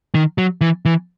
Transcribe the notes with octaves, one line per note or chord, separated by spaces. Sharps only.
D#3
F#3
E3
E3